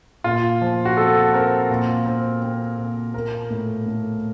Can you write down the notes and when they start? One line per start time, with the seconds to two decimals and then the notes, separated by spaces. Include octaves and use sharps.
0.24 A#2 F4
0.61 F3
0.85 F#4
0.97 C4 A4
1.33 C4 A#4
1.70 A#2
2.06 C4
2.43 C4
2.78 A#2
3.14 A#3 A#4
3.50 A2
3.86 A2